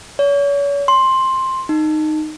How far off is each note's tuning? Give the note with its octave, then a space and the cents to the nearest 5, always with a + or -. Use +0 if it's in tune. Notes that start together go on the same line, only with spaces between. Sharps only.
C#5 +40
C6 +10
D#4 -10